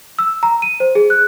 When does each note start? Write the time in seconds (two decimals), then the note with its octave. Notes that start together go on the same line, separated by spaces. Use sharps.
0.19 E6
0.43 A#5
0.62 D#7
0.80 C5
0.95 G#4
1.10 F#6